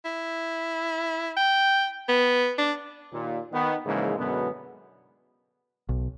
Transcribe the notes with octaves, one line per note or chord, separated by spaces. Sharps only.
E4
G5
B3
D4
D#2 A#2
D#3 B3
G#2 C#3 E3 F3 G#3 A#3
F#2 B2 D3 G#3 B3
B1